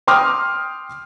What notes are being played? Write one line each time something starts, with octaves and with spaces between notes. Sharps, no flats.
G5 C6 D6 D#6 F6